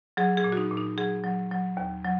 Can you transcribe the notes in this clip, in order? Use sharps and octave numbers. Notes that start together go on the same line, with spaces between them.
F#3 G#4
G#4
A#2
F#4
D#4
A#2
D#4
F#3 G#4
F#3
F#3
D#2
F#3